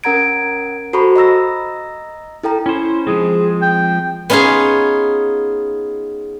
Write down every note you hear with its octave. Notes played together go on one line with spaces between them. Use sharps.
C#4 A#4 F#5 A#5 G#6 D7
F#4 A4 C5 A#5 B5 C#6
D#5 A#5 E6 A#6
E4 A4 G5 A#5
C#4 E4 C5
F3 G#3 C4 G#4
G5
B3 C#4 D#4 F4 G#4